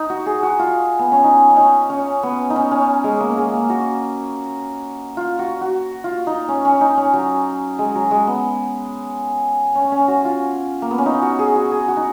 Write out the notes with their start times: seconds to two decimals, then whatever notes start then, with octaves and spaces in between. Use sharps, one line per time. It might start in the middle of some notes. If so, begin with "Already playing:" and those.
Already playing: D#4
0.10 F#4
0.26 G#4
0.43 F#4
0.59 F4
0.99 B3
1.12 C#4
1.24 D#4
1.51 C#4
1.57 D#4
1.90 C#4
2.23 B3
2.50 D#4
2.56 C#4
2.71 C#4
3.04 G#3
3.21 A#3
3.38 G#3
3.53 A#3
3.70 F#4
5.17 F4
5.39 F#4
5.61 F#4
6.04 F4
6.27 D#4
6.48 C#4
6.65 C#4
6.81 D#4
6.97 C#4
7.13 F#3
7.79 G#3
7.95 F#3
8.11 G#3
8.27 B3
9.75 C#4
9.92 C#4
10.08 F#4
10.25 F4
10.82 A#3
10.91 B3
10.98 C#4
11.06 D#4
11.22 F#4
11.39 G#4
11.55 F#4
11.71 G#4
11.88 F#4
11.97 D#4